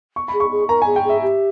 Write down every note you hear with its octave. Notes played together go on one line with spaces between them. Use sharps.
C#6
B5
G#4
C#6
G#4
A#4 A#5
G#5
G#4
G5
G#4 E5
G4